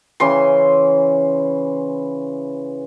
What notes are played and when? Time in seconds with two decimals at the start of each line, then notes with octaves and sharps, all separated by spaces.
0.20 C#3 E3 C6